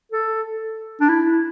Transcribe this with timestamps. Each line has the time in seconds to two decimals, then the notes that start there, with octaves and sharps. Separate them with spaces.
0.12 A4
1.01 D4
1.09 E4